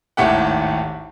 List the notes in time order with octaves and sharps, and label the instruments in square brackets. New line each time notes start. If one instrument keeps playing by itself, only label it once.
[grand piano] G#1 D#2 A2 A3 G4 F#5